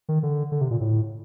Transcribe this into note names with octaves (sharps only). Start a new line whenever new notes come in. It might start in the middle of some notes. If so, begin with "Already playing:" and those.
D#3
D3
D3
C3
A#2
A2